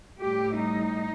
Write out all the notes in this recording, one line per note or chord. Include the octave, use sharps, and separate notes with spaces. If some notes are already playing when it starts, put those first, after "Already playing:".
A2 G3 G4
D#4